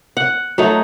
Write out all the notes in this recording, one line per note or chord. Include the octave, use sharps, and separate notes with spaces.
F#5
F#3 A3 D#4